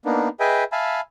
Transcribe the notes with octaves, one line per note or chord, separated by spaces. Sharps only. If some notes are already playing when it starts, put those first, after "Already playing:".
A#3 B3 D4 D#4
G#4 B4 D#5 E5 G5 G#5
E5 F5 G#5 A5 B5